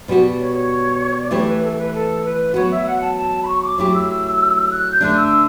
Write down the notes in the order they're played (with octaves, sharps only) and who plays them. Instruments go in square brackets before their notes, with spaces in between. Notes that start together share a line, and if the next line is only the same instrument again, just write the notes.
[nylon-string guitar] B2 G3 B3 F#4
[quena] C#5
C#5
D5
[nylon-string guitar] E3 A3 E4 G4 [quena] C#5
[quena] B4
A4
A4
B4
A4
B4
[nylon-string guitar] F#3 B3 F#4 [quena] C#5
[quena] E5
F#5
A5
A5
B5
C#6
D6
[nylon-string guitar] F#3 A3 E4 G4 [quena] D6
[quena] E6
F#6
G6
[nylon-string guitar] D3 A3 D4 [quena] F#6
[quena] E6